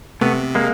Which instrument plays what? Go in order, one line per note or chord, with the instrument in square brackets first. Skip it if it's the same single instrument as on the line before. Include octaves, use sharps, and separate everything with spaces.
[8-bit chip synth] C3 [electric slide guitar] A3 B3
[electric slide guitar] G#3 A#3